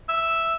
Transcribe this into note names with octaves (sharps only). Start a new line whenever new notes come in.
E5